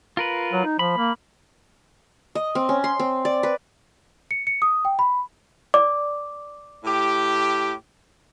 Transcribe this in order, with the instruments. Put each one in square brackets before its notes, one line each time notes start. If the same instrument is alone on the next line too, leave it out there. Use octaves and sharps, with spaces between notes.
[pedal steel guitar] F4 A#4 B4
[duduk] F#3
D#4
[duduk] F3 [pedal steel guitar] B5
[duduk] A#3
[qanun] D#5
C4
C#4
C6
C4
D5
B4
[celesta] C#7
C#7
D#6
G5
B5
[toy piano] D5 [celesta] D6
[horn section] A2 G4